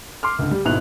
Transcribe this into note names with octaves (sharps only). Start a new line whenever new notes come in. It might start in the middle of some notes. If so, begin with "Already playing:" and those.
C6 D6 F6
C#2 D3
G3
G#1 G#2 B2 E4 F#6 F7